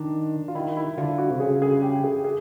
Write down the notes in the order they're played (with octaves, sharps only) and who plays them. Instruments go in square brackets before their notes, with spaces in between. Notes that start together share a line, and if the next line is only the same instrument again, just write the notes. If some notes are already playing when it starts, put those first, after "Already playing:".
Already playing: [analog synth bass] D#3 [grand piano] D4
[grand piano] F4
[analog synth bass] D#3 [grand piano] E4
[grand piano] E4
[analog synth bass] D3 [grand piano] F4
[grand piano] F#4
[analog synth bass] C3
[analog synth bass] C#3 [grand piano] G#4
[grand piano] G#4
G4
G#4
G#4